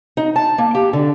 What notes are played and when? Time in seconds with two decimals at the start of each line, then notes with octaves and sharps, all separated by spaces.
0.17 D#4
0.36 A5
0.58 A#3
0.75 G4
0.93 D3